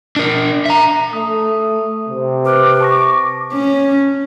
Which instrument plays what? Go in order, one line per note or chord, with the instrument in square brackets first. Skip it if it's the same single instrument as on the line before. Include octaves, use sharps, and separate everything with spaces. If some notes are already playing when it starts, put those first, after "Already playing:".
[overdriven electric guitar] D4 A#4
E5 A#5
[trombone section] A3 [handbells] D#6
[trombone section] C3
[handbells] B4 F6 F#6 [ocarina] D6
[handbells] A5 C#6 A#6
[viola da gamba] C#4